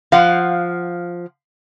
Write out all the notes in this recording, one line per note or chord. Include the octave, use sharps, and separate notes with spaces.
F3 F5 F#5